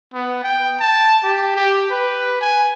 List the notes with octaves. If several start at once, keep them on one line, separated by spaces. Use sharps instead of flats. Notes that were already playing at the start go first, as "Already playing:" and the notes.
B3
G5
A5
G4
G4
B4
G#5